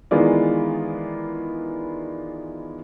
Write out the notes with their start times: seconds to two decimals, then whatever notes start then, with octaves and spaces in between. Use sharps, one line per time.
0.11 D#3 E3 G#3 B3 F4 D5